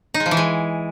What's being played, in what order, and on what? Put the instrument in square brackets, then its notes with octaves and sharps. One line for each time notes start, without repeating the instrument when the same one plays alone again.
[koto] D#4
G#3
F3
E3
G#3